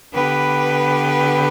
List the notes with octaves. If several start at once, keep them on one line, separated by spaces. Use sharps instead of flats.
D3 B3 G4 B4